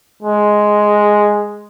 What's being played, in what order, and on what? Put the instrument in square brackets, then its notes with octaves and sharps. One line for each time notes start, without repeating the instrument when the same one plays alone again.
[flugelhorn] G#3